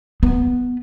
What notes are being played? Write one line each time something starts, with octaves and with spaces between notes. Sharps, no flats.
B3